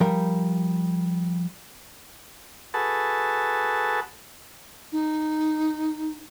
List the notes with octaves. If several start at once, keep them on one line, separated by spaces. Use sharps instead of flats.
F3 G3 A#4 G5
F#4 G#4 A4 B4 A5
D#4